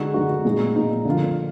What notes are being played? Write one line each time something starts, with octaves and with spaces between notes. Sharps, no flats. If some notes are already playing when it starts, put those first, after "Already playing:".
Already playing: D3 G#3 D#4 F#4
D3 G#3 D#4 F#4
A#2 G#3 D#4
A#2 G#3 D#4
D3 F3 A#3 F4